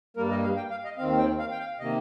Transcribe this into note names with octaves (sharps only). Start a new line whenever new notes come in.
G2 G3 A#3 A#4
D#5
F5
G5
F5
D#5
D#2 D#3 C4 F5
G5
F5
G5
F5
C3 D#3 A#3 D#5